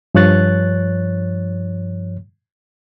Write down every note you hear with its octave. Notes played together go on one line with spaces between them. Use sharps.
G2 F3 C#5 F#6 A6